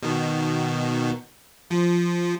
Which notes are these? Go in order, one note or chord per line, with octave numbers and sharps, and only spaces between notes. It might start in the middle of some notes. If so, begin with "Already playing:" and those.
B2 D#3
F3